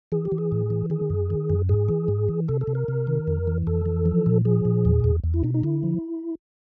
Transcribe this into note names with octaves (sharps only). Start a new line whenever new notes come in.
E3 G#4
G4
E3
G#4
A2
E3
D#3 G#4
F#2
D#3
F#2
G#2 G#4
E3
G#2
E3
C3 A4
A4
C3
A#4
C3
D#3
F2
E3
F2 A4
E3
F3
A#2
F3 G#4
A#2
E2
E2
E2
E4
B2 D#4
D#4
D3 E4
F3